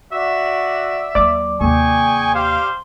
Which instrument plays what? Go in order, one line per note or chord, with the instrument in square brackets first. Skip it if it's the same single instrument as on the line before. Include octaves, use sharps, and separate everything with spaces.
[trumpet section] F#4 D5 [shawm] E5
[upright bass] D#2 F#3 [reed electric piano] D5 D6
[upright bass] D#2 C3 [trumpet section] G#4 G5 G#5 [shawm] C#6
[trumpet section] G4 F5 [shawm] C5